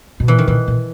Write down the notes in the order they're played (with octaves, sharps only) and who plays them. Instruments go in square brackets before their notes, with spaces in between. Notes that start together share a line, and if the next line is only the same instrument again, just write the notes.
[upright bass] B2
[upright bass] A#2 [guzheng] E3
[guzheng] D#3
[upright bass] A#2 [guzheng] E3
[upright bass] A#2